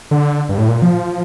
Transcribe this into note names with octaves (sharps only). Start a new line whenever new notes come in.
D3
G2
A2
A#2
F3